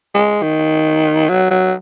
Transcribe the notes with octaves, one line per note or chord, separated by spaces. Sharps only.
G#3
D#3
F#3
F#3